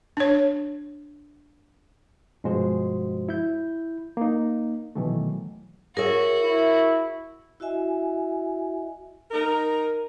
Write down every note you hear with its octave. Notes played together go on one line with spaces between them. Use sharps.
D4 C#5
G2 B2 F3 G#3 F#4 C5
E4 G6
A#3 D#4
B2 D#3 E3 F#3 A3
F#4 G#4 A#4 C#5 E5
E4
E4 F#4 D#5 E5 G#5
D#4 A#4